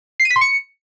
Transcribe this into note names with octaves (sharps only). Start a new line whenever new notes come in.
C7
D#7
B6
C6
C#7